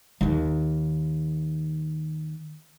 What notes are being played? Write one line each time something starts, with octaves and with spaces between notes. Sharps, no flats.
D#2 D#3